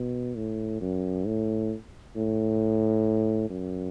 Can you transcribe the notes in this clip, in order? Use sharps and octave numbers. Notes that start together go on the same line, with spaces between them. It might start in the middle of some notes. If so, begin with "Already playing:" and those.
Already playing: B2
A2
F#2
A2
A2
F#2